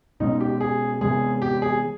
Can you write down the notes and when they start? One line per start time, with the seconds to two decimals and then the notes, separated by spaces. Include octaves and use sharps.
0.20 B2 G#3 C#4 D#4
0.40 G4
0.60 G#4
1.01 C3 E3 G#3 B3 G#4
1.42 G4
1.62 G#4